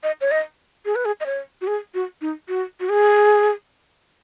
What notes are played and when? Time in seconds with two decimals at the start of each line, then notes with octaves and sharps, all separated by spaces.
0.03 D#5
0.21 C#5
0.31 D#5
0.85 G#4
0.95 B4
1.05 G#4
1.20 D#5
1.26 C#5
1.61 F#4
1.67 G#4
1.94 F#4
2.21 D#4
2.48 F#4
2.80 F#4
2.89 G#4